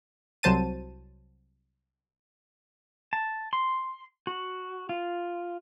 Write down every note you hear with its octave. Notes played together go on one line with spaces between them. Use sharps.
C2 F#3 C5 A5 D#7
A5
C6
F#4
F4